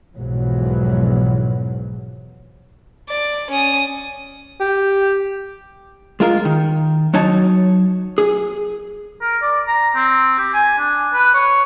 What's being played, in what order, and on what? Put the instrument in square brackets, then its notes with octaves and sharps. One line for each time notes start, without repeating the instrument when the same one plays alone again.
[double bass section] B1 E2 G#2 F3 F#3
[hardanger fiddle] D5
C#4 D#6
[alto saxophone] G4
[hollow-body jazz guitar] G#3 F4 A#4
D#3
F#3 D#4 C#5 A5
G#4
[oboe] A#4
D5
A#5
C4
G4
G#5
D4
B4
C#5